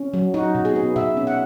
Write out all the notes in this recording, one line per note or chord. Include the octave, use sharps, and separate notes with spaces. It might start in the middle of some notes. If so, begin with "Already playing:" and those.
Already playing: C#4
F#3
D#4 F#4
B2
G#4
B3
B2 E5
C#4
F#5